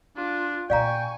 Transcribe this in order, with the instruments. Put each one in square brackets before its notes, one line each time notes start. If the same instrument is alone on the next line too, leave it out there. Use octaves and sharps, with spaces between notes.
[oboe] D4 [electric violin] F4
[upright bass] A#2 [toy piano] D5 F5 A#5 [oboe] G5 [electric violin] G#5 C#6